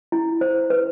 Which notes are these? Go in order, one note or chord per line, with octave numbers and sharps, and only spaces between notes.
E4
C5
B4